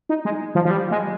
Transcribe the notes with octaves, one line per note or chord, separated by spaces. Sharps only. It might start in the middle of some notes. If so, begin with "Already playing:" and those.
D#4
G#3
F3
F3
G3
G#3